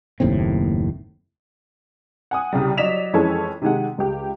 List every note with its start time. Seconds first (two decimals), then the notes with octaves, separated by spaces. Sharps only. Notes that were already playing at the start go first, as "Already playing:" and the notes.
0.20 F#1 D#2 A2 C4
2.31 F#5 G#5 D#6
2.53 C2 C#3 G3
2.78 F#3 D5 D#5 B6 E7 F7
3.13 F2 E3 G#3 C#4 A4
3.62 C3 D#3 G#3 F#5
3.98 C#2 G4